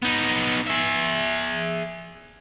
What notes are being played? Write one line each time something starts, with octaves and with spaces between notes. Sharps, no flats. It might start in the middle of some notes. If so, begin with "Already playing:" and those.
B3 D#4
G#4 E5